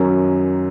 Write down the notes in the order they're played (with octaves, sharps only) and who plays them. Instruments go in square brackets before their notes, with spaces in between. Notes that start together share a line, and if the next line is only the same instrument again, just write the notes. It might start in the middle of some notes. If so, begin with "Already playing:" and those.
Already playing: [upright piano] F#2 D#3 F#3 C#4